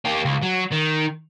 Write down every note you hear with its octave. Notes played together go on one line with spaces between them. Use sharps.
A#3 G4
C#2
F#3
D#3